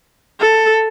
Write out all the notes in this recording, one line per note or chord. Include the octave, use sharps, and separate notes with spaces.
A4